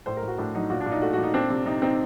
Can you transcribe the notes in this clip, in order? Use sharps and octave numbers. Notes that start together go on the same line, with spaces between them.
A2 C5
A#4
A2
F#4
A2 D4
F#3 D#4
A#2 F#4
D4
A#2
D#4
A3 F#4
F#4
A#2
D#4
C4 D4
C3
C3 D#4
C4 D#4